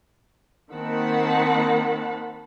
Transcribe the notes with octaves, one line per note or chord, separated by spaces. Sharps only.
D#3 A#3 C4 F#5 A5 B5